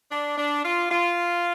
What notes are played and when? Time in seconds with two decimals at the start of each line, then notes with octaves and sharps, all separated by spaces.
0.10 D4
0.37 D4
0.63 F4
0.89 F4